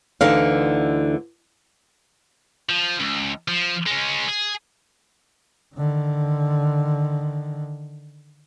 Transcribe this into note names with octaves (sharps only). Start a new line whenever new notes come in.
D2 D3 E3 D#4 F5
F3
C#2
F3
G#3 C#4
G#4
D3 D#3